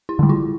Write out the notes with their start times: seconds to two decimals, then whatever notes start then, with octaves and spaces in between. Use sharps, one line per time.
0.09 E4
0.19 D3 G3
0.29 F4